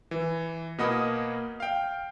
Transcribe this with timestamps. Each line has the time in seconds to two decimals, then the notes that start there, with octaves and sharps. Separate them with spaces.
0.11 E3
0.78 B2 A#3 D#5 F#5 B5 D#6
1.60 F5 G5